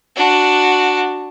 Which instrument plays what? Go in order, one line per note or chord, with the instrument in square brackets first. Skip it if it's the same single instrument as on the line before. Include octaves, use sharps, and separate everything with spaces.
[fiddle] D4 F#4